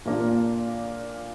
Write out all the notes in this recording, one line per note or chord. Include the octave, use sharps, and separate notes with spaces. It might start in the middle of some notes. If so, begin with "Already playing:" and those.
A#2 A#3 D4 F4